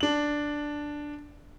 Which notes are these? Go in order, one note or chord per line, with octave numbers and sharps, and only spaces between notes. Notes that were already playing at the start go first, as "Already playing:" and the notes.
D4 F#7